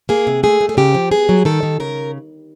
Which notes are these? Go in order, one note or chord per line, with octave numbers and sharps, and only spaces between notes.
A#3 G#4
C3
A3 G#4
A3
G#4
C#3 G4
F3
B3 G#4
F#3
D#3 A4
D#3
C#3 A#4